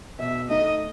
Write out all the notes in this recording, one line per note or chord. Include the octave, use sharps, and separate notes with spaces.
B2 E5
A3 D#4 D#5